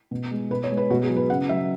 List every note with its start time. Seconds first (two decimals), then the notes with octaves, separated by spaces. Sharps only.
0.11 B2
0.31 G#3
0.50 B2 B4
0.64 C#5
0.70 G#3
0.77 B4
0.90 B2 F#4
1.03 G#4
1.10 F#3
1.17 B4
1.30 C#3 F#5
1.49 F#3 E5